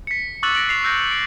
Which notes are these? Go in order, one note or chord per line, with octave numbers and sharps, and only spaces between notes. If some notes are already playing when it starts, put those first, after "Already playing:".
B6 C#7
C#6 D6 E6 F#6 A6 F#7
A#6 D7 F#7
C7 F7
E6 F#6 G6 A#6
D7